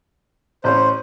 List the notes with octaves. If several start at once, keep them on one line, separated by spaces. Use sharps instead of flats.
A1 C#4 C5